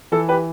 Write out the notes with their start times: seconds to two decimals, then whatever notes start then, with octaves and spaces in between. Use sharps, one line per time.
0.12 E3 A4
0.29 G4 B4